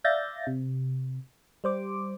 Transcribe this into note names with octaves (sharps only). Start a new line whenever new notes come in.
D5 E5 F5 G6 A6 A#6
C3
G3 C5 D6